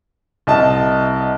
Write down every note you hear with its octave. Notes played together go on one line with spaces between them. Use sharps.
C2 D#5 A5